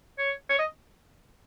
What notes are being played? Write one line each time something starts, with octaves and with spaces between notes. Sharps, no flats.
C#5
C#5
D#5